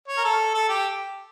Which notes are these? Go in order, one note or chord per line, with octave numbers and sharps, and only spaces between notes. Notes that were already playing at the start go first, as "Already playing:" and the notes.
C#5
A#4
A4
A4
G4